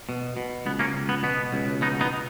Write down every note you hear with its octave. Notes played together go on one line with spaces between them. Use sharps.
B2
B2
C#2 B3
A#3 C#4
C#2
B3
B2 B3
C#2
B2 B3 D#4
B3 D#4